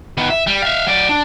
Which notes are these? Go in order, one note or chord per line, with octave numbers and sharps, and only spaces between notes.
D#3 B3
E5
G3
E5 F5
F#3 D5
D4